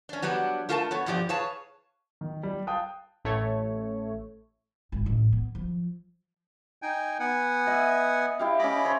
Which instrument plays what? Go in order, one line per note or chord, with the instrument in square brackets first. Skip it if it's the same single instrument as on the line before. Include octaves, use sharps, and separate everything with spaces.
[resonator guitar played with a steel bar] C#4 D4
F#3 G3 B3 D4
A3 F4 A4 A#4 G#5 A5
B3 A4 C#5
G2 B2 F3 G4 D5
G#4 B4 C#5 F5 A5
[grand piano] D#3
G3
F5 G5 A5 D#6 F#6
[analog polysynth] A1 A3 C#5
[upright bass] G#1
A1
B3
F3
[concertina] D#4 G5 G#5
B3 F#5 G#5
[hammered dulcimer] D#5 E5
E4 G4 F5
[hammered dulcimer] C#4 D6 [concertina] D#5 B5
[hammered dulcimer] C5 C#5 C6